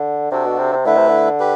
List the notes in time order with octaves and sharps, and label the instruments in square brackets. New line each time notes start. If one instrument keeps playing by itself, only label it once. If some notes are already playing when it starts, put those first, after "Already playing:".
Already playing: [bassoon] D3
[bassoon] C3 [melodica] D4 F#4 A4
[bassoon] B2
C3
C3
[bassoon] D3 [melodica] A3 E4 B4 E5
[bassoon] C3
D3
[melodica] G4 B4